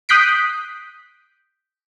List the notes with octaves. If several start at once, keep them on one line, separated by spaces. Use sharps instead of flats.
D#6 F#6 G6 B6 C7 D7